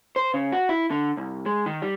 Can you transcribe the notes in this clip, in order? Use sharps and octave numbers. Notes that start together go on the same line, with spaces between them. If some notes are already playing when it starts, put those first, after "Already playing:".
C5
C#3
F#4
E4
D3
C2
G#3
D#3
G3